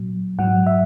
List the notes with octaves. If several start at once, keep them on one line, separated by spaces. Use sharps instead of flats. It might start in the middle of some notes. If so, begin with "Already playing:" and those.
Already playing: A#2 F#3
G#2 F#3 F#5
E5